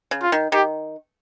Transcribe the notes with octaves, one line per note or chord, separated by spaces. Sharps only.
C#3
F4
D#3
D#3 G4